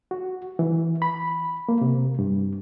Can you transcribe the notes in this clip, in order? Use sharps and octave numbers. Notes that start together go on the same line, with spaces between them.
F#4
E3
B5
A#3
C3
G2